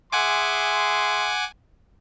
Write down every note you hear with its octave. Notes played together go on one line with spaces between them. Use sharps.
G#4 E5 F#5 G#5 C6 D6